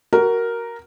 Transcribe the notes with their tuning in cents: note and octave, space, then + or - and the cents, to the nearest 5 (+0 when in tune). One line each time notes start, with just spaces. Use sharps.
F#4 +20 A#4 +0